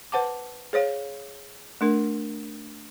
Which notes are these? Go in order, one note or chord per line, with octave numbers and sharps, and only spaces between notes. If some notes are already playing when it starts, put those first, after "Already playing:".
B4 C5 F#5 A5 D6
G#4 C5 C#5 F5
A3 D4 A#4